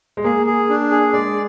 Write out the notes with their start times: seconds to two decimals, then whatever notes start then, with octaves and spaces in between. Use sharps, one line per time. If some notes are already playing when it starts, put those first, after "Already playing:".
0.17 G#3
0.24 A#3 G#4
0.47 G#4
0.70 D4
0.91 G#4
1.13 G#3 D5